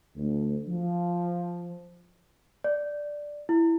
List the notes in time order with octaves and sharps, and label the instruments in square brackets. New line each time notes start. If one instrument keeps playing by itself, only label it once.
[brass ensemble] D2
F3
[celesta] D5
E4